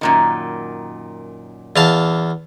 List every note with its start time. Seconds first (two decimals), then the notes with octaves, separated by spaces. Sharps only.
0.01 F#2 A#2 D#3
1.76 E2 F5 A5